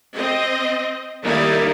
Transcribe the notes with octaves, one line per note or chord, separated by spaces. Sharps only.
C4 D#5
D#3 G3 A#3 D#4 E4 D5